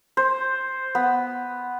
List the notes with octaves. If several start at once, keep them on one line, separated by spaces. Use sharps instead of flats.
C5
B3